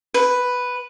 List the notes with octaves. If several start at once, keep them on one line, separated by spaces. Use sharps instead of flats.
B4